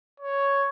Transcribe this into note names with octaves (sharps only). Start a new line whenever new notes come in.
C#5